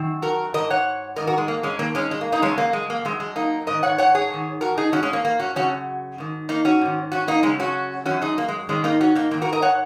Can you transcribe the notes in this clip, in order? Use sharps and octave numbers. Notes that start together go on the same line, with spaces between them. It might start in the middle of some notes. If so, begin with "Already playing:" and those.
Already playing: F#2 D#3
F#4 A#4
G#2 D#3 A#4 D#5
C#5 F#5
G#2 D#3 A#4 D#5
F#4 A#4
G#3
A#3
G#3 C#4
G#2 D#3 A#3
G#3 C#4
G#3
A#3
A#3 D#4
F#2 C#3 G#3 C#4
A#3
G#3
A#3
F#2 C#3 G#3
G#3
A#3 D#4
G#2 D#3 A#4 D#5
C#5 F#5
C#5 F#5
G#4 C#5
G#2 D#3
F#4 A#4
D#4 G#4
D#3 C#4 F#4
G#2
G#3 C#4
A#3
A#3
C#4 F#4
F#2 C#3 C#4 F#4
G#2 D#3
A#3 D#4
C#4 F#4
G#2 D#3
C#4 F#4
A#3 D#4
F#2 C#3 G#3 C#4
C#4 F#4
F#2 D#3 C#4 F#4
D#4 G#4
A#3
G#3
G#2 D#3 G#3 C#4
A#3 D#4
C#4 F#4
A#3 D#4
G#2 D#3 A#3
F#4 A#4
A#4 D#5
C#5 F#5